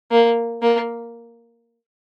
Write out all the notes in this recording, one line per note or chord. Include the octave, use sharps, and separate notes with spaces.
A#3
A#3